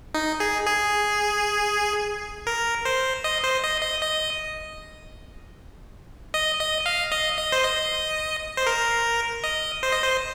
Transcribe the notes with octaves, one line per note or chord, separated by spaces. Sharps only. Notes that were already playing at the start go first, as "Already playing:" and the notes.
D#4
G#4
G#4
A#4
C5
D#5
C5
D#5
D#5
D#5
D#5
D#5
F5
D#5
D#5
C5
D#5
C5
A#4
D#5
C5
D#5
C5